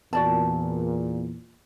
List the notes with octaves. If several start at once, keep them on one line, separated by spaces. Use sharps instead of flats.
E2 A#2 F#4 D5 A5